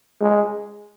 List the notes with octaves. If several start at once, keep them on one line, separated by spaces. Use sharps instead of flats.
G#3